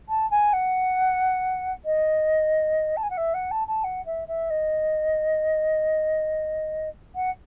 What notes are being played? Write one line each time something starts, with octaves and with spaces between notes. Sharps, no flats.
A5
G#5
F#5
D#5
A5
G#5
F#5
E5
F#5
A5
A5
F#5
E5
E5
D#5
F#5